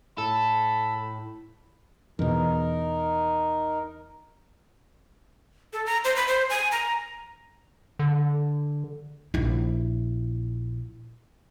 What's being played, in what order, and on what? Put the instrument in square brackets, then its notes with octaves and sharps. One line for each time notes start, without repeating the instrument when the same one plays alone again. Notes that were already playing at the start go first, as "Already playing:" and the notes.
[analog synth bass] A2 [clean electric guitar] A4 [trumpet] B5
[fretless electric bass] E2 B2 [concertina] D#4 A#4
[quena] A4
A#5
C5
B5
C5
G#5
A#5
[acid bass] D3
[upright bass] A#1 E4